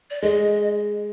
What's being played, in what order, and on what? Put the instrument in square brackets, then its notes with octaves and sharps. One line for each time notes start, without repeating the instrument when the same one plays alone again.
[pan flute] D5
[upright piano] G#3 [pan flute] D#5